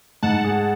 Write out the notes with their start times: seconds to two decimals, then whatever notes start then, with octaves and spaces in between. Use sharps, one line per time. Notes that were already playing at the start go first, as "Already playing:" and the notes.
0.23 G#2 F#5 A5
0.44 G#4